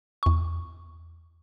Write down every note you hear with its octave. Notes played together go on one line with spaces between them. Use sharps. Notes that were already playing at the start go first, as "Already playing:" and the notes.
E2 C#6